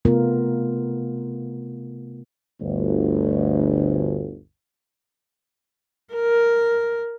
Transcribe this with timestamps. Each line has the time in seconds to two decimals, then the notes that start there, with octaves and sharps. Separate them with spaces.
0.05 C3 A3 B3 F4 A#4
2.61 G1 D2
6.14 A#4